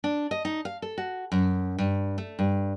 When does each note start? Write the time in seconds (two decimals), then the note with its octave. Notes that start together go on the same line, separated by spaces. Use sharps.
0.04 D4
0.31 D#5
0.45 D#4
0.65 F5
0.82 A4
0.98 F#4
1.32 F#2
1.79 G2
2.18 A3
2.39 G2